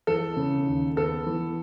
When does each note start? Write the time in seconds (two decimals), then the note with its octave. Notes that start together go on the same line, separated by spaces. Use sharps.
0.07 E3 A4
0.37 C#3
0.67 D#2
0.96 B3 A4
1.27 E3